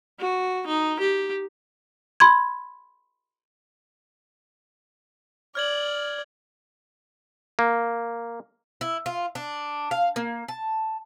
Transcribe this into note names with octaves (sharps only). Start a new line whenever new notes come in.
F#4
D#4
G4
B5 C6 G#6
D5 F6 G#6 F#7
A#3
E4
F4
D4
F5
A#3
A5